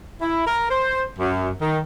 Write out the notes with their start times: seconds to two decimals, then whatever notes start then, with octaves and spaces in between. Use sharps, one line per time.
0.21 E4
0.46 A#4
0.70 C5
1.19 F#2
1.61 D#3